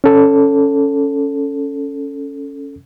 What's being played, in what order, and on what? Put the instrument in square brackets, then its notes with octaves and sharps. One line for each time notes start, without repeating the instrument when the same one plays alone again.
[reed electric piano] C#4 A4